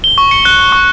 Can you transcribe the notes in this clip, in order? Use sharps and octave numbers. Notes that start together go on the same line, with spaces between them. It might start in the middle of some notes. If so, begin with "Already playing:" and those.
G7
C#6
C#7
F#6
G7
C#6